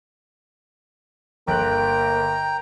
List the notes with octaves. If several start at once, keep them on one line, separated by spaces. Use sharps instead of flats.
G1 A#3 G5 A#5 F#6